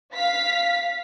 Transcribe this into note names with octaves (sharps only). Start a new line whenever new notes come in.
F5 B6